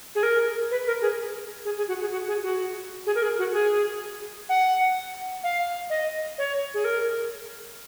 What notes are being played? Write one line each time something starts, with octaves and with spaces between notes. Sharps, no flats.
G#4
A#4
B4
A#4
G#4
G#4
G#4
F#4
G#4
F#4
G#4
F#4
G#4
A#4
G#4
F#4
G#4
F#5
F5
D#5
C#5
G#4
A#4